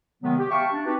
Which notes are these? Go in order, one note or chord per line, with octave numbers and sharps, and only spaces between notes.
C3 D#3 F#3 G#3 B3
G4
E5 F5 G5 A5 C#6
D4
C4 D4 D#4 F#4 G4 B4